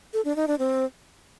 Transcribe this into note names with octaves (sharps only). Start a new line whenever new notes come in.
A4
D4
D#4
D4
C4